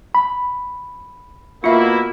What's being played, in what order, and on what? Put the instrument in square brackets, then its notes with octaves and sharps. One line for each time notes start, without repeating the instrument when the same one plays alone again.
[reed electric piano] B5
[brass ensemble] B2 A#3 E4 [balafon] F4 E5